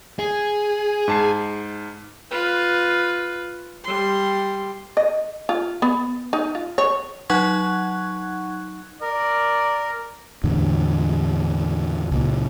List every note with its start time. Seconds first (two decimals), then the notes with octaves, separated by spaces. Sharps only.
0.19 G#4
1.08 G#2 A5 C7
2.31 F4 B4
3.84 G3 C6
4.97 D#5
5.49 F4
5.82 B3
6.33 D#4
6.55 F4
6.78 C#5
7.30 F#3 D#4 F#5 C#6 F#6 G#6
9.02 A#4 D5
10.44 E2 A2 D3
12.11 C#2 A#2